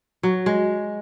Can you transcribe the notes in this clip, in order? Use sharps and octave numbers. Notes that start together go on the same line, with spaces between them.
F#3
G#3